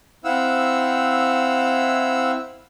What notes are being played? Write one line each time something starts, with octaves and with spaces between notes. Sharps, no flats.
C4 E4 F5 F#5 E6